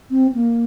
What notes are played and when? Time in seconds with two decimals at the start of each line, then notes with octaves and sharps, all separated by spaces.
0.11 C4
0.35 A#3